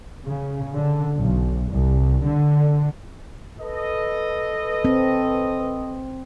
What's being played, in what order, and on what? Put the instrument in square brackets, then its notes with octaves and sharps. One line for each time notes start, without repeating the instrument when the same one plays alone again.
[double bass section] C#3
D3
B1
C2
D3
[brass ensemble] A4 B4 D#5
[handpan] C4